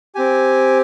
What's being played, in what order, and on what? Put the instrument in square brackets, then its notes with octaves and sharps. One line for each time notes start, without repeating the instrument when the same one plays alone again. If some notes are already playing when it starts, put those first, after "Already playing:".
[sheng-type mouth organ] C4 G4 G#5